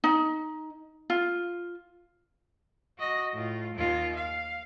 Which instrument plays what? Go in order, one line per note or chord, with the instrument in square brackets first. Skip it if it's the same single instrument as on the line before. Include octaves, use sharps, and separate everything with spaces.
[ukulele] D#4
F4
[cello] F#4 D#5
A2 F4
D#2 F4
F5